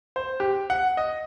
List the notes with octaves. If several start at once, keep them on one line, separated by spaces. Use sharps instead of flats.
C5
G4
F#5
D#5